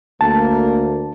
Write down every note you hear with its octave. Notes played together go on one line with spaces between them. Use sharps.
D2 A#3 A5